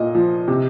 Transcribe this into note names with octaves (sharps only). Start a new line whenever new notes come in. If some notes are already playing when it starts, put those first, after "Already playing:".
Already playing: A#2 D#5
F3
C3